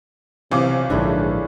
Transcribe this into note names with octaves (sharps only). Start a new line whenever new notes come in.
B1 C3 E3 F3 D6
A#1 G#2 D3 D4 E4 C#5